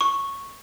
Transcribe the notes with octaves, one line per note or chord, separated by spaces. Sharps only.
C#6